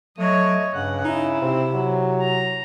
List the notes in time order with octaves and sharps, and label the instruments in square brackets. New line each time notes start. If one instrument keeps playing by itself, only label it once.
[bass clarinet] F#3 [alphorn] A3 [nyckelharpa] C#5 D#5
[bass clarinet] G2 [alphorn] C#3 [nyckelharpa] F#5
[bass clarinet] D#4 [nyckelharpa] E4
[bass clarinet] C3 [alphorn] C4
[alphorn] F#3
[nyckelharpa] A#5